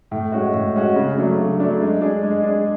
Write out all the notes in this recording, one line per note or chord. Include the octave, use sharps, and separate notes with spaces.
A2
G#3 C#4 F#4
A2
G#3 C#4 F#4
C#3
F#3 A3 D4
C#3
F#3 A3 D4
G#3
D4 G#4
G#3
D4 G#4